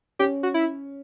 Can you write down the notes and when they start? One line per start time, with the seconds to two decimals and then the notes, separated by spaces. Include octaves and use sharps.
0.19 C#4 G4
0.43 F#4
0.54 E4